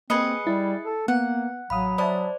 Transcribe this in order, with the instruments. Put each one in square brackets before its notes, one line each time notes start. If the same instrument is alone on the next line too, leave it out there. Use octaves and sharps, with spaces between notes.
[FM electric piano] A#3 [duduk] C4 [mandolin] G#4 B4 D#5 [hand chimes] C#7
[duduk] G3 [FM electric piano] E4 A6
[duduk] A4
[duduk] A#3 [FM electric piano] B3 [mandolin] F#5
[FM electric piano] A1 F5 D#6 [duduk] F#3 [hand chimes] B5
[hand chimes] C5 D5 [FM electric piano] E5 A5 B5 [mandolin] D#6